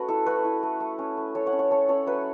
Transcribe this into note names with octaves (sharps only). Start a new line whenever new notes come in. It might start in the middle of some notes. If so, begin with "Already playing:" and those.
Already playing: A3 C#4 F#4 B4 F#5
E4 A4
A3 F#4 B4
E4
A3
A3
C#4
A3
C#4 A4 C#5
C#5 F#5
C#4
C#5 F#5
C#4 A4 C#5
C#4 A4 C#5
F#3 B4 E5